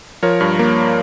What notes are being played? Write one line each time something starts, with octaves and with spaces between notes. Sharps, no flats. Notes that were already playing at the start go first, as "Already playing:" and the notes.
F3 A#4 C#5
G2
A#3